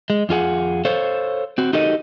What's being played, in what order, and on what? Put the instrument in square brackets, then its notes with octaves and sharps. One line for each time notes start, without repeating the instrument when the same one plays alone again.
[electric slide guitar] G#3
F2 F4 G#4 F#5
A4 C5 C#5 F5
C4 F#4
D#4 F#4 G4 A4 A#4 D#5